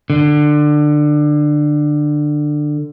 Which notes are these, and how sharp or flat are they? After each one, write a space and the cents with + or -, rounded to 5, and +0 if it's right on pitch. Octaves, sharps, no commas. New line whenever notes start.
D3 +20